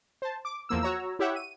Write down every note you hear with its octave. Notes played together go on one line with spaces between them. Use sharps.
C5 A5
D6
E2 F3 A#3 E6
F#4 C#5 A#5 E6
E4 G4 C#5 E5 F#5
D#7